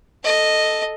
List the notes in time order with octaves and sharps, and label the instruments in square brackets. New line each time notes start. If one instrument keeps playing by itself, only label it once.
[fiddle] A4 D#5